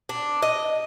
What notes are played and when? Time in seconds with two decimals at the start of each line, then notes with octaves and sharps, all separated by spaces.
0.09 D4
0.42 D#5